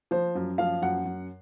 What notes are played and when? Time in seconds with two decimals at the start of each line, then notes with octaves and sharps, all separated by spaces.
0.11 F3 C5
0.35 F#2
0.58 F3 F5
0.82 F#2 F#5
1.05 F#2